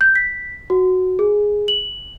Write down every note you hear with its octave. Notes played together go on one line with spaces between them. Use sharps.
G6
B6
F#4
G#4
F#7